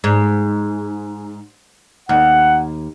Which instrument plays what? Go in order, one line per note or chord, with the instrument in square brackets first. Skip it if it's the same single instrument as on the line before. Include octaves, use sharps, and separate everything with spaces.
[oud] G#2
[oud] D#2 [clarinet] F#5